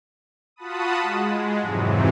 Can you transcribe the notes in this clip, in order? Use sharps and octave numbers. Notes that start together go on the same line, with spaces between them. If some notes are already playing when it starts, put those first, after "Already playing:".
F4 F#4 F#5 A5 B5 D#6
G#3
F2 G#2 C3 E3 F#3